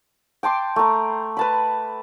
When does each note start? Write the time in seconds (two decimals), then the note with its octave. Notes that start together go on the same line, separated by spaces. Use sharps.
0.43 G5 A5 C6 D6
0.76 A3 A#5
1.37 B4 A5 B5